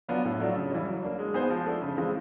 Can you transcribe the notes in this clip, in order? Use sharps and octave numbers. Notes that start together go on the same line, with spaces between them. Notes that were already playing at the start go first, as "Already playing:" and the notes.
F#3 B3 D4 F4
A2
F#3 A3 D4 F4
C#3
E3 G3
F#3
A#3 D4
G#3
B3 D#4 G#4 C5
F3
A3 D4
C#3
E3 G#3 C4 F4